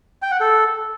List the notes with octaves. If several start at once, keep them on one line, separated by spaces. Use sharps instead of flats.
G5
F#5
A4